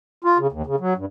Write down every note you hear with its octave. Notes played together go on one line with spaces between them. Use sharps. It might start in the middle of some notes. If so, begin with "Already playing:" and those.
F4
C#3
D#2
C#3
F#3
G2